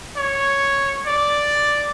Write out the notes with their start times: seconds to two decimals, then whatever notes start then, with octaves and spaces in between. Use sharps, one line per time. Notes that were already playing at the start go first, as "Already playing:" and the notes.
0.17 C#5
1.07 D5